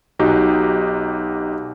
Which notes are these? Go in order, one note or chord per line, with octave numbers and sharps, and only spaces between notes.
B1 D#4 F#4 G4